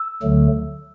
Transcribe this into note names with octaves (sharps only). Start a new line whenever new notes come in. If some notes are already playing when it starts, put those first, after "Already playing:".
Already playing: E6
D2 D3 F#3 A3